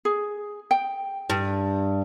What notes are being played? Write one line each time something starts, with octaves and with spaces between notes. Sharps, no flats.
G#4
G5
G2